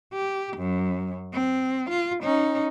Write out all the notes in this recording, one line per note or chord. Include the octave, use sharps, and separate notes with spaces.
G4
F#2
C4
F4
C#4 D#4